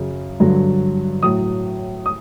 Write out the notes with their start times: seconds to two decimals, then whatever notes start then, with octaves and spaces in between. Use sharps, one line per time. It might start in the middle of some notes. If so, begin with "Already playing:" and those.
Already playing: F#2 C#3 F#3
0.40 G2 D3 F#3
1.23 A2 F#3 D#6
2.06 D#6